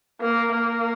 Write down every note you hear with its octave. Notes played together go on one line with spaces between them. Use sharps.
A#3
A#3